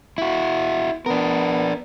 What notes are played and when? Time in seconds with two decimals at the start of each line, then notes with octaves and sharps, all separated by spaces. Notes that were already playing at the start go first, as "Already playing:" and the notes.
0.18 E4 F#4
1.06 B3 D4 A#4